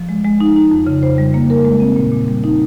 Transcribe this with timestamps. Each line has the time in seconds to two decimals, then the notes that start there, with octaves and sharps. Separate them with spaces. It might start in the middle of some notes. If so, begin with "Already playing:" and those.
Already playing: F3
0.09 G#3
0.25 G#3
0.40 D#4
0.56 D#4
0.71 F2
0.87 C#3
1.03 C5
1.18 G3
1.34 A#3
1.50 A#4
1.65 G#3
1.80 C4
1.96 A#2
2.12 A#2
2.28 G3
2.44 D#4